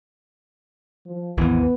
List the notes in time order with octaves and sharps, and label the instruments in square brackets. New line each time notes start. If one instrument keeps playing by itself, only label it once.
[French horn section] F3
[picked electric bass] G#1 D#2 E3 [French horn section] B3 B4